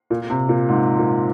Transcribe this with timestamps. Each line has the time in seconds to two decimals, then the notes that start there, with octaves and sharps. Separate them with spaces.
0.10 A#2
0.30 C3
0.49 A#2
0.68 G#2
0.98 A#2